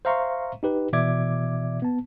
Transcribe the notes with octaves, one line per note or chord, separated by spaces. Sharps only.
C5 E5 F5 A#5 C6 C#6
D#4 G4 B4
B2 E3 D5 E5 D6 G#6
B3 A5